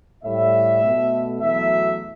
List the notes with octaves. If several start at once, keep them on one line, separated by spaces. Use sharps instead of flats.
A2 G3 E5
B2 A3
E2 B2 F#3 A3 E5